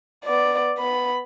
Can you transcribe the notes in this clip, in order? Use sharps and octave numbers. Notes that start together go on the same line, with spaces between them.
B3 D5
B3 B5